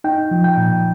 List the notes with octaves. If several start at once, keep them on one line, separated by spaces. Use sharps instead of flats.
D#4 G5
F3
G5
A#2